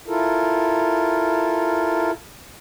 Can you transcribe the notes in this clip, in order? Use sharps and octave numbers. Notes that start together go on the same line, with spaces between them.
E4 F4 A4 A#4